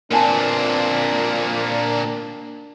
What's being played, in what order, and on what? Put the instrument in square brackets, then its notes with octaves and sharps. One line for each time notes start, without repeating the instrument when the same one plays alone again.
[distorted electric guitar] A#2 C4 [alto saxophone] A#3 [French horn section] D4 [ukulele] B4 G#5 A5